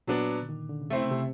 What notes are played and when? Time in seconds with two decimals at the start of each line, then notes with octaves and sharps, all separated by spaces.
0.07 A#2 F#3 B3 D4
0.42 D3
0.49 D#3
0.69 D3
0.82 C#3
0.90 C3 A3 C4 E4
1.01 C#3
1.11 C3